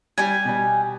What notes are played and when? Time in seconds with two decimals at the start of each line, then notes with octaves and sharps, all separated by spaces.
0.18 G3 G4 G#5
0.45 B2 G3